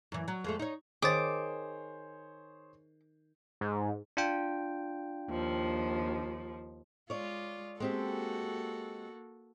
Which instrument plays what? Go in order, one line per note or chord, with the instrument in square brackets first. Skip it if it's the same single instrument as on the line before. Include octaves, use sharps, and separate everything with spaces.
[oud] F#2 E3
F#3
F2 G#3 A3
D#4 C#5
[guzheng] D#3 [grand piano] G#4 C5 C#5 [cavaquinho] D6 [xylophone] D#6 A6
[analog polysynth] G#2
[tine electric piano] D4 F4 G5
[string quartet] D#2 F3
[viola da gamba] G#3 F4 [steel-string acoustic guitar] C#5 D5
[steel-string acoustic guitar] G#3 C4 G4 [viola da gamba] A#3 F#4 A4